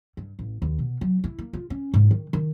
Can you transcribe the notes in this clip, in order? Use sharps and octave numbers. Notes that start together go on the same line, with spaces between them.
G2
A1
D#2
B2
F#3
E4
A#3
F4
C#4
G#2
D#3
D#3